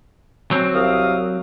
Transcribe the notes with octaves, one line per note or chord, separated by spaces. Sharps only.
F#3 C4
C2 F5 D#6